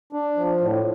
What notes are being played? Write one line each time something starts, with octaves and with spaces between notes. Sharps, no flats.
D4
F3
A2